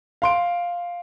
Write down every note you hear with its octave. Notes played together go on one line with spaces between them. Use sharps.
F5 C6 D7